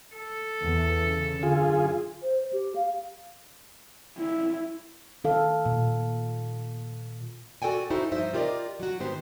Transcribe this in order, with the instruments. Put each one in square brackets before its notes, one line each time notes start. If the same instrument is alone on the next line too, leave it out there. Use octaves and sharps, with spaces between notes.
[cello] A4
[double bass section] E2
C#3
[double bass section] F#2 D3 [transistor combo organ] F4 G#4
[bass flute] C5
G4
F5
[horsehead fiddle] E4
[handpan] D#3 A4 F5
A#2
[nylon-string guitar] F#4 A4 D5 G5 G#5
D#4 E4 F#4 A4 C5
G2 F3 D#4 C5 E5
F4 G4 A#4 C5 D5 D#5
F#3 F#4
G#2 D#3 B3 G4 C5